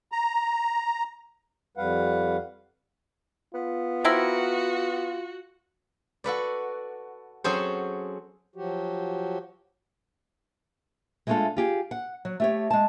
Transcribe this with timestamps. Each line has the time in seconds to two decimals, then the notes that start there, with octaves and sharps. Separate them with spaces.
0.12 A#5
1.77 F2 G3 B4 F5 F#5
3.54 B3 F4
4.04 C4 E4 F#4 A#4
6.24 F#4 A4 B4 D5
7.44 F#3 C4 C#4 G#4 A4 C5
8.56 F3 F#3 F#4 G4
11.27 G#3 A3 D4 D#4 F4 A4
11.57 F4 G4 G#4
11.91 F#5
12.25 F#3
12.40 A3 G4 C#5
12.71 G#3 A5